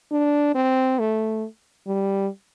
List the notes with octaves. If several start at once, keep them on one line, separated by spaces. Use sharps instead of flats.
D4
C4
A3
G3